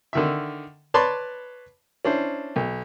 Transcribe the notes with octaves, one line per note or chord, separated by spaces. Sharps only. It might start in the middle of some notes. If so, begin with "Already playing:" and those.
D3 D#3 E5
B4 C#5 D5 A5 B5 C6
C#4 D4 E4 C5
B1